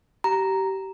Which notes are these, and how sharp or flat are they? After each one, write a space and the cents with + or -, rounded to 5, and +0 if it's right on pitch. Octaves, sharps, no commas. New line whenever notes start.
G4 -25 A#5 +0